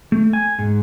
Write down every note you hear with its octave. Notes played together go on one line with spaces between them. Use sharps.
A3
G#5
G#2